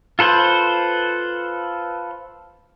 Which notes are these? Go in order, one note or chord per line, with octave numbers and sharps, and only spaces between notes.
F4 A4 B4 C5